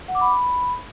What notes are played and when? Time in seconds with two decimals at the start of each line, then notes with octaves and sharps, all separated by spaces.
0.08 F#5
0.15 D6
0.21 B5